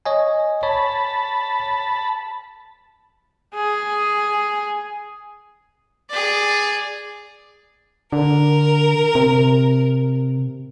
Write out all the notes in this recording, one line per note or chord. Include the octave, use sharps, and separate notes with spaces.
C#5 D#5 G#5
C#5 A5 B5
G#4
G#4 D5
D3 A#4
C3